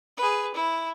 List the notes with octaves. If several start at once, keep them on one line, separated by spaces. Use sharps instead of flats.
G#4 B4
E4